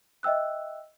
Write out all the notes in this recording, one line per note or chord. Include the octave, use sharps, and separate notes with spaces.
D#5 E5 G5 E6 F#6